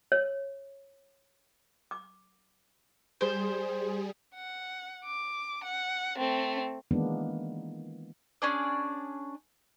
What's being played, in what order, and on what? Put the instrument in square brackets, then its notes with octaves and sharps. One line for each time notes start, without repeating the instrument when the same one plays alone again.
[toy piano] C#5
D6
[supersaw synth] G3 G#4 [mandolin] C5
[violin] F#5
D6
F#5
A3 C4
[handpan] D#3 E3 G#3 A#3 B3 D4
[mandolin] C#4 D4 G#4 D5